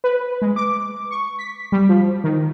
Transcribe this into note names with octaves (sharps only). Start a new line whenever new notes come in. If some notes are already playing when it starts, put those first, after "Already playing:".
B4
G#3
D6
C#6
B6
G3
F3
D#3